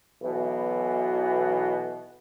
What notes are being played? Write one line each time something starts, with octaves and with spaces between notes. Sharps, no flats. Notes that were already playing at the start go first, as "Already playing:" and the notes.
B1 B2 E3